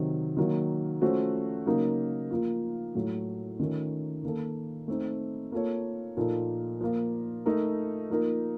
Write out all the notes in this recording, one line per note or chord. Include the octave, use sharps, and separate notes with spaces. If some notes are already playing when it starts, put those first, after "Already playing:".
Already playing: C3 D#3 F#3 C4
D#3 F#3 A#3
F3 A3 C#4 F#4 C5
C#3 F#3 A#3 D#4 A#4
F3 A#3 F4
A2 F#3 A3
D#3 A3 C#4 F4 A#4
D#3 A#3 D#4 A4
A3 C4 D#4
A#3 F4 A4 C#5
A#2 F3 A#3 D#4 A4
F3 A#3 F4
A3 D#4 A#4
F3 A#3 D#4 A#4